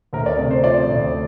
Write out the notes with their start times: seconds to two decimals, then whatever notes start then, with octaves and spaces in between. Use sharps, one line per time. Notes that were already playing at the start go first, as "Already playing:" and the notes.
0.13 D2 A#4
0.26 D5
0.38 C3
0.51 C5
0.64 F3 D5
0.89 D2